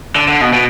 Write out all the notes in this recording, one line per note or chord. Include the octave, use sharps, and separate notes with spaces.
D3
D3
B2
B2